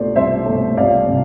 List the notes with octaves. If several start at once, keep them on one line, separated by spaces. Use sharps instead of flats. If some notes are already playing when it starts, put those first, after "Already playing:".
Already playing: C2 B2 A3 C5 D5
C2 C5 E5
B2 A3
C2 D5 F5
C3